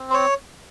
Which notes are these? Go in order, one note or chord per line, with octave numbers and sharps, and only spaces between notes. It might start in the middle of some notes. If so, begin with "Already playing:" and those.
Already playing: C4
C5
C#5